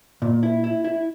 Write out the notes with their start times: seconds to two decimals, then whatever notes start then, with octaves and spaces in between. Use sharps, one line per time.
0.22 A#2
0.43 E4
0.64 E4
0.84 E4